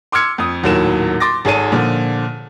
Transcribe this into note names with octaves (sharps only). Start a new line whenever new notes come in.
C6 D6 E6 F6 G#6 C#7
F2 D#6
D#1 D#2 A2 F#3 A#4 E7
C6 D6 A6 A#6
G#1 G#4 A4 C#5 A5 D#7
A#2 D3 F3